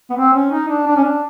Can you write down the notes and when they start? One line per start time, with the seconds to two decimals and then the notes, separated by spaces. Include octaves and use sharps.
0.10 B3
0.16 C4
0.34 C#4
0.51 D#4
0.68 D4
0.87 D4
0.97 C#4
1.04 D4